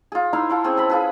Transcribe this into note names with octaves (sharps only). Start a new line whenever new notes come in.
F4 G#4
D#4 E4 F5 C6
E4 F4 A4
C4 C#4 G#4 C#5
A4 B5
F4 G#4 B4